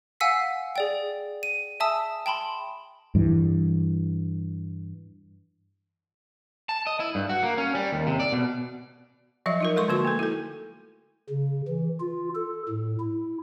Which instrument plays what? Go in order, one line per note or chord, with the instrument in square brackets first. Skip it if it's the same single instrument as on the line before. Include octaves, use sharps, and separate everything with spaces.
[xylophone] F5 F#5 G#5 E6 B6 C7
G#4 D5 G5
D#7
E5 G#5 A5 D#6 E6
G5 A5 B5 C6
[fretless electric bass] G2 E3
[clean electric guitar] A5
D#5
E4
G2
F#4
A#3
C#4
G3
D#2
C3
D5
B2
[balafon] F3 F#3 D5 E5
D#4 F4 A#4
G#3 A4 C6 C#6
D3 A#3 F#4 C#6
A3 A4
E4 A4
[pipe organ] C#3
E3
F4
A4
A2
E4